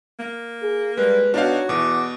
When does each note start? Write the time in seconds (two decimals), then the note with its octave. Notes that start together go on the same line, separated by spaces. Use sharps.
0.19 A#3
0.62 G#4
0.97 G3 G#3 B4
1.34 B2 D4 D#4 F#4 C#5 F5
1.69 E2 B2 D6